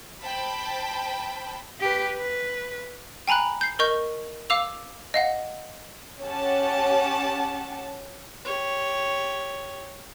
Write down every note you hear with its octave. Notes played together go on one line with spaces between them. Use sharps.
C5 G5 A5 B5
G4 B4
B4
G5 G#5 A#5 B5 F#6
G6 C7
A#4 D#5 C#6 G6
F5 D6 E6 F7
D#5 F5 F#5
C#4 G4 F#5 A5
G4 C#5